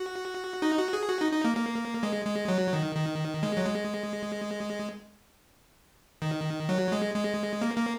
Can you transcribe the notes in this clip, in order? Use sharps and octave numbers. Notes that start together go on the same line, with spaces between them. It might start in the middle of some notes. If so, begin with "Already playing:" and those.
Already playing: F#4
D#4
F#4
G#4
F#4
D#4
D#4
A#3
A#3
G#3
G#3
F#3
D#3
D#3
G#3
F#3
G#3
D#3
F#3
G#3
G#3
A#3
A#3